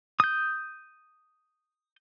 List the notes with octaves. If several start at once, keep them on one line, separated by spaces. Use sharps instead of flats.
D#6 G6